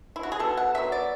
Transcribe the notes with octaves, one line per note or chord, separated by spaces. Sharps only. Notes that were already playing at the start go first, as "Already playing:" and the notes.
E4
F#4
G#4
B2 A4
F#5
F#3 B3 E5
D5